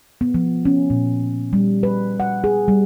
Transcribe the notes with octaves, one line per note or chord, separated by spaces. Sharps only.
B3
F3
C#4
A#2
G3
B4
F#5
G#4
G3